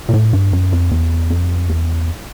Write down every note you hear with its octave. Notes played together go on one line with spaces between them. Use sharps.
A#2
A2
G2
F#2
F2
E2
F2
E2